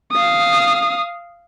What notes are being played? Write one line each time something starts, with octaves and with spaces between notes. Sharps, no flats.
F5 D#6